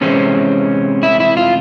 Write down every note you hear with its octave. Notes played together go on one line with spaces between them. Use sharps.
C3 E3 G#3 C4 C#4
E4
E4
F4